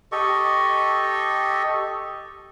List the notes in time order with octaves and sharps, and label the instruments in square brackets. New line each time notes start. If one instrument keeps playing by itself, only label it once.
[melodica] G4 A4 D#5 C#6